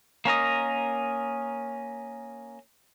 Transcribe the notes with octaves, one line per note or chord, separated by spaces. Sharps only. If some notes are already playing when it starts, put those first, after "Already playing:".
A#3 C#4 A#4 D#5